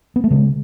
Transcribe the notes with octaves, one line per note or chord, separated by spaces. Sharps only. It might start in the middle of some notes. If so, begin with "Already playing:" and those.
B3
A3
C#3 G#3